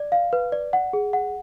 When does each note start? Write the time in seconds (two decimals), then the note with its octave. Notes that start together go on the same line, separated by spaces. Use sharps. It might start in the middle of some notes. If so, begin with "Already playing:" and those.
Already playing: D5
0.12 F5
0.33 B4
0.52 D5
0.73 F#5
0.93 G#4
1.13 F#5